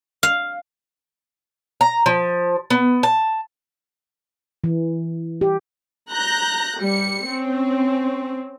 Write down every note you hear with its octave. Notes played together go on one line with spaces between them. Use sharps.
F5
A#5
F3
B3
A5
E3
G4
A#5 F#6 G6 A#6
G3 C#7
C4 C#4